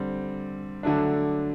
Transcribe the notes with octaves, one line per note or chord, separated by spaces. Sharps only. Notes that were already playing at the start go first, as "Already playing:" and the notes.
Already playing: D3 G3 C4
D3 F#3 A3 D4